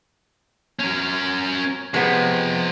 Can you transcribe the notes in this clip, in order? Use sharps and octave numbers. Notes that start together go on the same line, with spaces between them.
C#4 A#4
C3 F3 G#3 B3